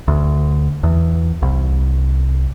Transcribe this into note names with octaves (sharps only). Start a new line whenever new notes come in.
D2
E2
C2